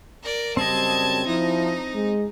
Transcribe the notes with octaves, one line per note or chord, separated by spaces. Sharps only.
A#4 D5
F#2 C#3 G3 C4 D#5 A5 G#6
F3 D#4 E4
G#3